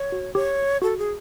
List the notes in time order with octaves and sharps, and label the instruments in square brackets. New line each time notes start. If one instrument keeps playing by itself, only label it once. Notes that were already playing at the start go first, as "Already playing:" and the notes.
Already playing: [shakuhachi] C#5
[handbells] F#4
[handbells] G4 [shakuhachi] C#5
[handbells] F#4 [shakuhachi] A4
[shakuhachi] G#4